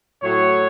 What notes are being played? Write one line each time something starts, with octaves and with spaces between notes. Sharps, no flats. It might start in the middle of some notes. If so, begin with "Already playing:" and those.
A2 F#3 C#5